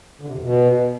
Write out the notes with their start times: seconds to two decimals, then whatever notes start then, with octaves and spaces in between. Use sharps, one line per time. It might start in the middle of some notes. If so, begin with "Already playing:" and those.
0.21 D3
0.28 C3
0.35 F2
0.42 B2